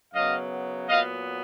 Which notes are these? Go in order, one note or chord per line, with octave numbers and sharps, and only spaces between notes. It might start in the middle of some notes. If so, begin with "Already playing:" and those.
F#2 C#3 F#3 B3 D#5 F5
A#2 F#3 B3 D#5 F5